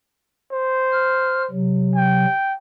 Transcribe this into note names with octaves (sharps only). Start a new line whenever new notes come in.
C5
F6
C3 F#3
G5